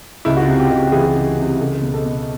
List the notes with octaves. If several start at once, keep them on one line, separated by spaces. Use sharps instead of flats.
C#2 E4
F#4
F4
C3
G4
C#2
G4
E3 G#4
C#2
C3
C#2 A4
B2
A4
B2